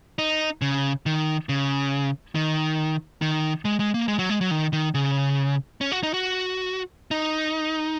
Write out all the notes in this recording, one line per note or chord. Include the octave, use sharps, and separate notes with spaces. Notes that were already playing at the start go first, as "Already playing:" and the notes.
D#4
C#3
D#3
C#3
D#3
D#3
G#3
G#3
A#3
G#3
F#3
G#3
F#3
D#3
D#3
C#3
C#4
F#4
D#4
F#4
D#4